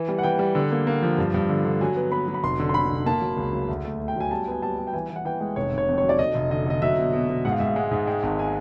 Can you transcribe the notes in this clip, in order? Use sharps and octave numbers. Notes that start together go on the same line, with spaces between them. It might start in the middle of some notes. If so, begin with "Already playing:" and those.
Already playing: E3
G3
F#5
E3 G5
G3
D3
A#3
A#3
F3
G2
G2
D3
D3
F#3 G#5
B3
B3 B5
F#3
B5
F1 C6
D3
C6
D3 B5
F1
A#3 A5
F#3
C#2
F#3
D2
A3
A3
G5
F#3 G#5
G3 A5
B3 G#5
G3 A5
G3
G5
E3 G#5
E3
F#5
E3 G5
G#3
F1 C#5
F1
C#5
F2
C#5
F#3
D5
F1 D#5
F1
D3 D#5
D3 D#5
F#3 E5
B2
B2
B2
G#2 F#5
F5
G#2 E5
F5
G#3 F#5
G#2
G#3 G5
G#1
G#5